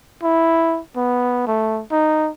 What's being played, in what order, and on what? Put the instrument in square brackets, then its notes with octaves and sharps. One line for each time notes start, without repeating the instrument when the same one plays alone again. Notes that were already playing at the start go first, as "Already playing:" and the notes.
[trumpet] E4
B3
A3
D#4